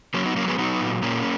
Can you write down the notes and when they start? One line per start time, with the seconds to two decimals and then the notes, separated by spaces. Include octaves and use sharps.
0.14 F#3 A#3 C#4
0.26 B3 D#4
0.36 F#3 A#3 C#4
0.48 G#3 B3
0.59 F#3 B3 D#4
0.81 A#2
1.03 A#2 A#3 C#4